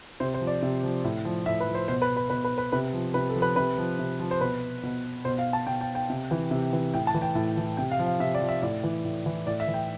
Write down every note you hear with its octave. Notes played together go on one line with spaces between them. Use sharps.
C3 C5
C5
F3
D5
C3
F3
A2
F3
A2 E5
B4
F3
C5
B2 C5
B4
B4
B2 B4
B4
B4
C3 B4
F3
C3 B4
A4
F3
B4
C3 B4
F3
C3
F3
C5
B2 B4
B2
B2 C5
F5
A5
B2 G5
G5
G5
C3
E3
C3
E3
A2 G5
A5
E3
G5
A2
E3
C3 G5
F5
F3
F5
C3 E5
D5
F3
E5
A2 D5
E3
A2
E3
A2 D5
E5
E3
G5